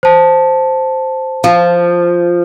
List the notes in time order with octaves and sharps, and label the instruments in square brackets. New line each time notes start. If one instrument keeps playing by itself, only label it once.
[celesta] C5 A5
[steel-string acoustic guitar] F3